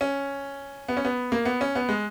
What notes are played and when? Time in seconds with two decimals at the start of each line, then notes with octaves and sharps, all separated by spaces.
0.01 C#4
0.88 B3
0.97 C#4
1.05 B3
1.32 A#3
1.45 B3
1.61 C#4
1.75 B3
1.89 G#3